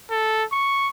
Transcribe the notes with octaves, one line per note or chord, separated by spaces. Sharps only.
A4
C#6